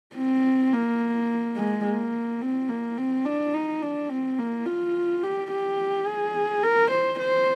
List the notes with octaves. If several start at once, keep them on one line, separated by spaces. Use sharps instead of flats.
C4
A#3
G#3
A#3
C4
A#3
C4
D4
D#4
D4
C4
A#3
F4
G4
G4
G#4
A#4
C5
C5